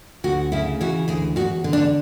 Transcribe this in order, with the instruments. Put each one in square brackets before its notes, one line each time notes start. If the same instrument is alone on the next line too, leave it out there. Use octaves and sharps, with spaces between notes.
[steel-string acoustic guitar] D2 F#4
C#3 E4
E3 F#4
D2 G#4
E2 F#4
D3
D4